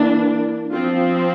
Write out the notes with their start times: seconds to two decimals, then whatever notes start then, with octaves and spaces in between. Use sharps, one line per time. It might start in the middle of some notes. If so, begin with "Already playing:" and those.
Already playing: E3 A#3 D4
0.72 F3 C4 F4